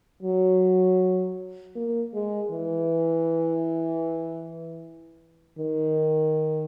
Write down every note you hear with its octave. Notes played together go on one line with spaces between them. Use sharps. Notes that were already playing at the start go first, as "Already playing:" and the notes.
F#3
A#3
G#3
E3
D#3